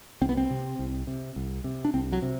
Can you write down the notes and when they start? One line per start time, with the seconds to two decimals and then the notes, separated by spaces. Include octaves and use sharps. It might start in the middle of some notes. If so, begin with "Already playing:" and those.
0.21 C2 C4
0.29 B3
0.37 C4
0.51 C3
0.79 C2
1.07 C3
1.36 C2
1.64 C3
1.85 D4
1.94 C2 C4
2.12 F#3
2.22 C3